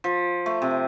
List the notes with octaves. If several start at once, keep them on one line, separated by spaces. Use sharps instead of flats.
F3
A3
C3